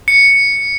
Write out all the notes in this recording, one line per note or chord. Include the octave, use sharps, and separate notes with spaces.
C#7